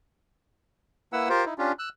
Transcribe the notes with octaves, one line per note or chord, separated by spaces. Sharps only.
A#3 E4 B4 F#5 E6
F4 G4 A#4 C5
D#4 E4
C#4 D4 F4 G4
E6 F#6